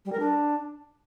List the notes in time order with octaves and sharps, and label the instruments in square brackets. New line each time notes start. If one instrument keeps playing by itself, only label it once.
[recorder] G3
A#4
D4